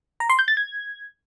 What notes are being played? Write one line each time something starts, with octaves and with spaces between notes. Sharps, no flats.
A#5
C6
G6
A6
G#6